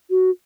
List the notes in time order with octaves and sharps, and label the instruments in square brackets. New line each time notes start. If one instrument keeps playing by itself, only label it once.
[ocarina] F#4